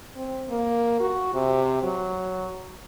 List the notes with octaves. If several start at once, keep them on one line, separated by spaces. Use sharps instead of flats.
C4
A#3
F#4
C3
F#3